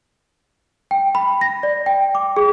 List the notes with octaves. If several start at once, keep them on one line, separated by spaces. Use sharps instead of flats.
G5
B5
A#6
D5
G5
D6
G#4